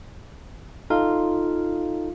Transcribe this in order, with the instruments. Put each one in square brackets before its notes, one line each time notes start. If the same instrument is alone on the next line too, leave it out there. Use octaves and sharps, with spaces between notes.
[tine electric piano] D#4 A4 [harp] F4